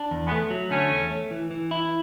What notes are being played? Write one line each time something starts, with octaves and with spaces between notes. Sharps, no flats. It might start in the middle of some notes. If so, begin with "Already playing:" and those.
Already playing: D4
E2
G#3 B3
A3
F#3
D3 A3 C#4
E2
A3
E3
E3
E4